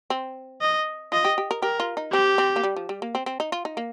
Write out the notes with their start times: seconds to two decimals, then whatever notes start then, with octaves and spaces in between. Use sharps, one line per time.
0.10 C4
0.62 D#5
1.12 F4 D#5
1.25 G4
1.38 G4
1.51 A#4
1.62 G4 A#4
1.80 F4
1.97 D#4
2.13 C4 G4
2.38 C4
2.56 A#3
2.63 G3
2.76 F3
2.89 G3
3.02 A#3
3.15 C4
3.26 C4
3.40 D#4
3.52 F4
3.65 D#4
3.77 A#3